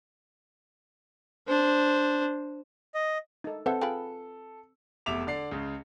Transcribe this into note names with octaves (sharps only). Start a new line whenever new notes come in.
D4 C5
D#5
D#4 A4
C4 A4 B4 C5 E5 F#5
F4 G#4 B4 G5 B5
F1 E2 E5 D6 F7
D3 D5 C7
C#2 C#3